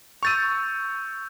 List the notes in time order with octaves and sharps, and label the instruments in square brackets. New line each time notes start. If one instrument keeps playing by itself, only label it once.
[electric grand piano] C#6 A6 D#7 [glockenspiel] E6 G6 F7